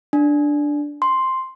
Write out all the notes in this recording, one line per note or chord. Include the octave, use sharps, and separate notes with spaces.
D4
C6